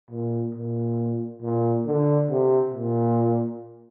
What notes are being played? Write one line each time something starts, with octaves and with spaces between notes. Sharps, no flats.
A#2
A#2
A#2
D3
C3
A#2